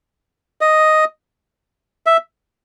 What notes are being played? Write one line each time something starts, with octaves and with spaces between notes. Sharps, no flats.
D#5
E5